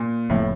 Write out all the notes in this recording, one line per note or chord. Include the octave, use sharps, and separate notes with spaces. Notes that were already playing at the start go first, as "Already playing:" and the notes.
Already playing: A#2
F1 F2 A2 C#3 F3